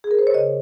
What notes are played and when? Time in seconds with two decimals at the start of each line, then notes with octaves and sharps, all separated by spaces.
0.04 G#4
0.11 A#4
0.19 C5
0.27 C#5
0.34 C#3 D#5